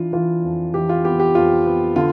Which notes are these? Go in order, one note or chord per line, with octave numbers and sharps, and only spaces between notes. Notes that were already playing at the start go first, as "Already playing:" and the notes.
Already playing: E3 D4 F4
E3 F4
F2
E3 G4
F4
B3 G4
G4
F2 F4
B3
D3 F4